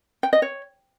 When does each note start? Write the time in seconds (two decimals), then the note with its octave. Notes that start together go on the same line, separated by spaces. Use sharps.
0.23 G5
0.33 D#5
0.42 C#5